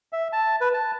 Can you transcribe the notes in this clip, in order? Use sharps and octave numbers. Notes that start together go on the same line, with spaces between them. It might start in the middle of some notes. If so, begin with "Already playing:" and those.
E5
A5
B4
A5